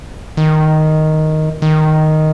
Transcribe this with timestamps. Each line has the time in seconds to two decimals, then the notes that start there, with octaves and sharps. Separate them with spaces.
0.37 D#3
1.62 D#3